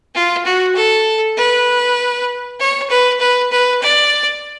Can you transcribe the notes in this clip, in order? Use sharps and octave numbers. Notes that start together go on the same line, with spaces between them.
F4
F#4
A4
B4
C#5
B4
B4
B4
D5